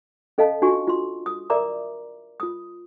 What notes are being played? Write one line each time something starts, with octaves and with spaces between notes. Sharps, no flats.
C#4 A4 D#5 F5 A5
D4 F4 F#4 G#5 C#6
F4 C6
D#6
A#4 D5 E5 A#5 D6
F4 D#6